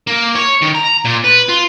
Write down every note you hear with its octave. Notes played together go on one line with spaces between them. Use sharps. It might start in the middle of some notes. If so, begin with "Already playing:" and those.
A#3
C#5
D#3
A#5
A#2
B4
F4